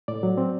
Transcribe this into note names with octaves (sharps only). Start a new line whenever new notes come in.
A2 D5
F#3
C4